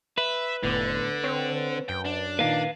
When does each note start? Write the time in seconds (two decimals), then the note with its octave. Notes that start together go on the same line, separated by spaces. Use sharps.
0.18 B4 E5
0.63 F1 A2 D3 B3 D6
1.24 C4 C#5
1.89 F#2 G5
2.06 D4
2.39 A#2 D#3 A#3 B4 F5